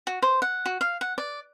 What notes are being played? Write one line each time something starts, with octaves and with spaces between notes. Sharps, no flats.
F#4
C5
F#5
F#4
F5
F#5
D5